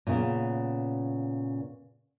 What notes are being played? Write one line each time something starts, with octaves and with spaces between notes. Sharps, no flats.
A#2 C#3 B3